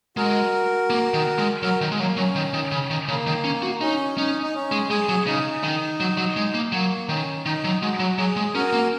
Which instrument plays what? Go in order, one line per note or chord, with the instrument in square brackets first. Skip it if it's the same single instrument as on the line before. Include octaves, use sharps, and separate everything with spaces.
[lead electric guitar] G#3 [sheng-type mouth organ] F#4 A#4
[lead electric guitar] A#3
D#3
G#3
[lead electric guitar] F#3 [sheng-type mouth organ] F#4 A#4
[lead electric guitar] D#3
G#3
[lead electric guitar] F#3 [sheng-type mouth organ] A#3
[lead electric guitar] F#3 [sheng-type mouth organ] C#4
[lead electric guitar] D#3
D#3
C#3
D#3
[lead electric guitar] C#3 [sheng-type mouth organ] A#3
[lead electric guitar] D#3
C#4
F#4
[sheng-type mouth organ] C#4 [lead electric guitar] D#4
[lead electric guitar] C#4 [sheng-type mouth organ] D#4
[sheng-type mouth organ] D#4
C#4
[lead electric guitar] G#3
[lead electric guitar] G#3 [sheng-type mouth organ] G#4
[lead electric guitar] F#3
[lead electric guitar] C#3 [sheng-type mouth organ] D#4
[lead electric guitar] D#3
F#3
F#3
G#3
A#3
[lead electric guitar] F#3 [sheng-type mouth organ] A#3
[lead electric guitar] D#3 [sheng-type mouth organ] C#4
[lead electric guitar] D#3 [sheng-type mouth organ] D#4
[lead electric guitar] F#3
[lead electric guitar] G#3 [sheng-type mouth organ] F#4
[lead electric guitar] F#3
[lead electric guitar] F#3 [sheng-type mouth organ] G#4
[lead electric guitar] G#3
[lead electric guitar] C#4 [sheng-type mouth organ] F#4 A#4
[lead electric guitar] A#3